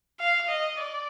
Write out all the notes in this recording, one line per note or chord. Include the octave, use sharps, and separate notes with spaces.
F5
D#5
D5